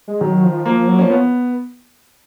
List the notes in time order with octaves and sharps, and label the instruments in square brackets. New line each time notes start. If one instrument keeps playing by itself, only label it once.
[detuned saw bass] G#3
[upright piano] D#3 [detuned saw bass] F#3
[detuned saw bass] F3
[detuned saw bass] F3 [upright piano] A#3
[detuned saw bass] F#3
[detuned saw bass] F3 [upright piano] C#4
[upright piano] B3